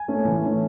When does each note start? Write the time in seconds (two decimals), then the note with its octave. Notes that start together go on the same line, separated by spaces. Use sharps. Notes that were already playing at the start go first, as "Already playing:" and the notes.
Already playing: G#5
0.08 A3 C#4
0.25 E3
0.42 A3 C#4